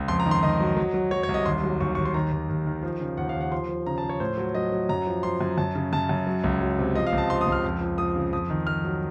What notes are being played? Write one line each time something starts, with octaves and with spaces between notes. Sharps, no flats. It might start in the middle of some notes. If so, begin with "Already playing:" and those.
Already playing: C#2
F2 C6
A#5
D#3
C6
D#3 D#5
F#3
F#3
F#3
F#3 C#5
C#5
C2
D#5
D#2 C6
F#3
D#2 C#6
D#2 C#6
C6
D#3 A#5
D#2
D#2
D#3
F3
C#3
D#2 F#5
F5
D#2
F#5
F3 C6
F3
C#3 A#5
A5
F3
C#5
A2 C5
F#3
F#3 D#5
F#3
F#2 A#5
F3
F3 C6
F#2
F#2 A5
C#3
F#2 A5
F#2
F#3
C#2
F#3
C3
F3 D#5
F5
C#2
A5
F3 C6
D#6
C#2
F6
F2
F3
F3 D#6
C#3
F2 D#6
D#3
F2 F6
F#3